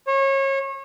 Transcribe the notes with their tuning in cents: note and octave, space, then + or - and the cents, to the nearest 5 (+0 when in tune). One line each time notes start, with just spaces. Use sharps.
C#5 -30